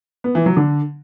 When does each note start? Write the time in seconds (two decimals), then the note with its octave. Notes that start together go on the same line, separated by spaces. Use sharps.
0.24 B3
0.35 E3
0.46 F#3
0.57 D3